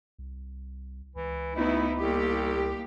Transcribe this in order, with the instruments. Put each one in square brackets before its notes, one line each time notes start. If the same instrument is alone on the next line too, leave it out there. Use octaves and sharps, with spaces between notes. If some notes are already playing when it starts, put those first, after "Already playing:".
[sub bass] C2
[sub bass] C#2 [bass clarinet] E3
[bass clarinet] D2 [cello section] B3 D#4 E4
[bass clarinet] C2 [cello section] A#3 G4